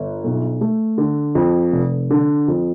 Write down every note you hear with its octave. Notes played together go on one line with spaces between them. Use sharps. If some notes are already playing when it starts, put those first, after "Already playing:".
Already playing: G1
B1
A3
D3
F2
F1
D3
F2